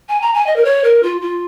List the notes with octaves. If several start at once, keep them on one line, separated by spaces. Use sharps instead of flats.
G#5
A#5
G#5
D#5
A#4
C#5
A#4
F4
F4